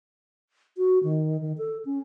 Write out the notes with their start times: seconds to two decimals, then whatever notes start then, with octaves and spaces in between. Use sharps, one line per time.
0.77 F#4
1.03 D#3
1.41 D#3
1.58 A4
1.85 C#4